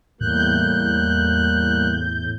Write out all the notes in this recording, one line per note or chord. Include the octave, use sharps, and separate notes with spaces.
E2 A2 G3 A#3 F#6 G6